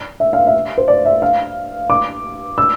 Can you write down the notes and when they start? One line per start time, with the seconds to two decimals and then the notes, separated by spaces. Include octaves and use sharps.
0.20 E5
0.33 F5
0.47 E5
0.78 C5
0.88 D5
1.05 E5
1.22 F5
1.90 D6
2.58 E6